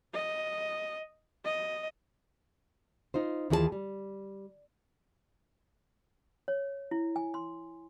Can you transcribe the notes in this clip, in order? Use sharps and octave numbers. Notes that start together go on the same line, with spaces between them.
D#5
D#5
D#4 F4 C5
D#2 E3 F4 G#4 C5 A5
G3
C#5
E4
G#5
C6